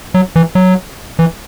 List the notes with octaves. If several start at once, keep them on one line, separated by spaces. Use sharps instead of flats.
F#3
E3
F#3
E3